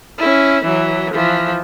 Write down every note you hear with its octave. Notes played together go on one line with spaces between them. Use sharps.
C#4 E4
E3 F#3
E3 F3